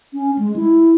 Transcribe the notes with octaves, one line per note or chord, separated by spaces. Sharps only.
C#4
G#3
E4